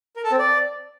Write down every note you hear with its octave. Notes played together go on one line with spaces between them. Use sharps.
A#4
A4
C4
D5